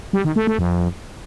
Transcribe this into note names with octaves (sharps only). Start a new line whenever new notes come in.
G3
D#3
A3
A3
F2